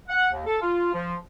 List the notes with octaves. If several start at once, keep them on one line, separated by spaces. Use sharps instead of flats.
F#5
D#2
A4
F4
F3